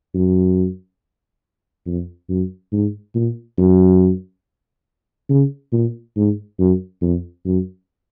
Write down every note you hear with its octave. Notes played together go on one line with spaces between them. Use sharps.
F#2
F2
F#2
G#2
A#2
F#2
C#3
A#2
G#2
F#2
F2
F#2